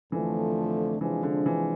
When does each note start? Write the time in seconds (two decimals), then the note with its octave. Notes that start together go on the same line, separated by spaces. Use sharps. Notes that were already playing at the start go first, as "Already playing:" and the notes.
0.12 F2 D3 E3 F3 A3
1.01 C3 E3 F3 G#3 D4
1.23 D3
1.46 E3